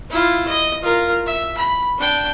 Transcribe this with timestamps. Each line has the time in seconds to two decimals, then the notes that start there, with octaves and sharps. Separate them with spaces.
0.10 E4 F4
0.48 D#5
0.82 F4 A#4
1.27 E5
1.57 B5
1.98 D4 G5